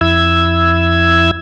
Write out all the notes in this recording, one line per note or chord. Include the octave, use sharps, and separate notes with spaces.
F2 E4 E6 G#6